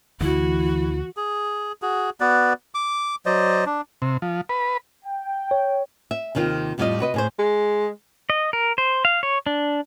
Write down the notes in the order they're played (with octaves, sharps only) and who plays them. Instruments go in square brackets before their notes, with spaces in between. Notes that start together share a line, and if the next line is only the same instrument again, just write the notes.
[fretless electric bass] D2 [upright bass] E3 [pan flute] E4 [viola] F#4
[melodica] G#4
F#4 G#4
B3 F#4 B4 D5
D6
F#3 C5 D5 D#5
D4
[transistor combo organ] C3
F3
B4
[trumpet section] G5
[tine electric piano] C#5
[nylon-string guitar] E5
D#2 C3 D#3 C4 F4
F2 A2 G3 A3 F4 D#5
C3 F#4 B4 D#5
A2 G#4 C5
[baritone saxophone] G#3
[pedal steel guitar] D#5
A#4
C5
F5
C#5
D4